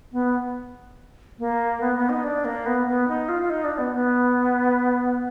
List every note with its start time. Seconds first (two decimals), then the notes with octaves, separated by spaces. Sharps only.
0.12 B3
1.39 A#3
1.81 B3
1.95 B3
2.09 D#4
2.23 D4
2.45 A#3
2.66 B3
2.87 B3
3.08 D#4
3.29 F4
3.42 F4
3.50 D#4
3.64 D4
3.78 B3
3.92 B3